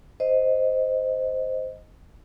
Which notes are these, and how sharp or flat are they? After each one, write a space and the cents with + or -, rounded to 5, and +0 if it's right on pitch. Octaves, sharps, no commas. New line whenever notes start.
C5 -5 D#5 +0